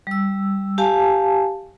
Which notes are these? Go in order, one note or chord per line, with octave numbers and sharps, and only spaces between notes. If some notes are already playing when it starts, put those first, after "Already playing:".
G3 E6
G4 F5 G#5 A5